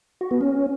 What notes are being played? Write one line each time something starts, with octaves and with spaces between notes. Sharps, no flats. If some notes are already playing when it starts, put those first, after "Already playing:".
F#4
B3
C#4